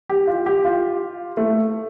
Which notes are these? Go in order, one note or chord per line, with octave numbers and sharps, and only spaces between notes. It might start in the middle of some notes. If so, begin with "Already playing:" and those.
G4
F4
G4
F4
A3